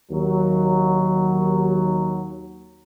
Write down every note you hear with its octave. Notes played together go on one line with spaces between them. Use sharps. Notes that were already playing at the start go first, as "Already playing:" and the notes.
D#2 F#3